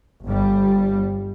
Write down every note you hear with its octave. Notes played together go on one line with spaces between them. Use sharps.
G1 G3